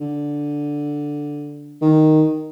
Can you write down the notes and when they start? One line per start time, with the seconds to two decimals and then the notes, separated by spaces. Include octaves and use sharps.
0.01 D3
1.82 D#3